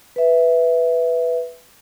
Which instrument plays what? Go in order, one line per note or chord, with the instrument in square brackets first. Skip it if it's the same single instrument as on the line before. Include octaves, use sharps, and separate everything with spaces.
[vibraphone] B4 E5